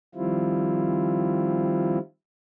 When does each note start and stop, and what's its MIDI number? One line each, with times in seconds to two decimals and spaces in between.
0.15 1.98 51
0.15 1.98 53
0.15 1.98 55
0.15 1.98 60
0.15 1.98 64
0.15 1.98 65